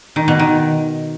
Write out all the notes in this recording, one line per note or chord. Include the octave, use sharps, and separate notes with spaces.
D#3
B2
D#3